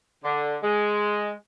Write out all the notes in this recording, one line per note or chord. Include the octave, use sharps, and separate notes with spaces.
D3
G#3